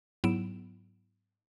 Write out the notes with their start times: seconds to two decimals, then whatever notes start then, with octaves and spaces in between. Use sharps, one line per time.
0.24 G#2 F#3 B3 E4 D7 E7